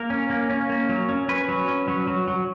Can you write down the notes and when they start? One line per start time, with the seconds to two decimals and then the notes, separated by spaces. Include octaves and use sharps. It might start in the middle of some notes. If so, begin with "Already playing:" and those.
Already playing: A#3 A#4
0.10 C#4
0.30 A#3
0.50 C#4
0.69 A#3
0.89 F#3
1.09 C#4
1.29 C#4 B4
1.49 F#3
1.68 C#4
1.88 F#3
2.07 F#3
2.28 F#3